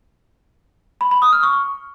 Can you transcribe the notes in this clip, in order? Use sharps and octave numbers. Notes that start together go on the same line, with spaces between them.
B5
B5
D#6
F6
C#6